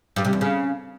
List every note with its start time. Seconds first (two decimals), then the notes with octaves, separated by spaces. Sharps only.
0.16 G2
0.25 C3
0.33 E2
0.41 C#3